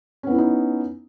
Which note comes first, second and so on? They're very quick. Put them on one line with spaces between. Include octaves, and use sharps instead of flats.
C#4 B3 E4 B4 D#4